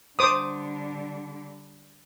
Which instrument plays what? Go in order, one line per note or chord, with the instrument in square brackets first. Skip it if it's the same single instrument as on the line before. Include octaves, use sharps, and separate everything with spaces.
[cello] D3 G3 [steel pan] C5 D6 D#6